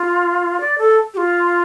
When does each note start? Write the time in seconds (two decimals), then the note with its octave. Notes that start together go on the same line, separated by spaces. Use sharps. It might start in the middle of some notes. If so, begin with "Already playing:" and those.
Already playing: F4
0.60 D5
0.78 A4
1.14 G4
1.17 F4